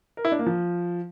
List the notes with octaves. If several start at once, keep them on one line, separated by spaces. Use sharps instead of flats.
A#4
E4
D4
A#3
F3